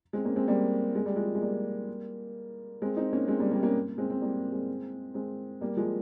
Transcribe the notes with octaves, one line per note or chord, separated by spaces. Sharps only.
G#3 C4
A#3 C#4
G#3 C4
G3 A#3
G#3
G3
F3 G#3
G#3
G3 A#3
G#3 C4
C4 D#4
A#3 C#4
G#3 C4
G3 A#3
G3 A#3
A#3 C#4
G#3 C4
C4
G3 A#3
G#3 C4
G#3 C4
G3 A#3
F3 G#3